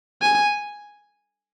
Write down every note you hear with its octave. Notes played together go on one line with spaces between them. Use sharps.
G#5